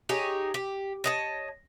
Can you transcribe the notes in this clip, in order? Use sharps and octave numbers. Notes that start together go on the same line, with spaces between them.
D#4 G4 G#4 C#5
G4
C#5 D#5 A5